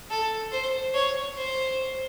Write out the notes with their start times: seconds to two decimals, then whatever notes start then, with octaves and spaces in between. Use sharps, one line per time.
0.10 A4
0.52 C5
0.94 C#5
1.37 C5